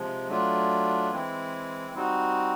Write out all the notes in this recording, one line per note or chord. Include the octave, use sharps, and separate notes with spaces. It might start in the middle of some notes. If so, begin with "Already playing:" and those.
Already playing: C3 F3 G#3
F#3 A3 D4 F4
E3 G#3 C4 E4
G3 C4 D#4 F#4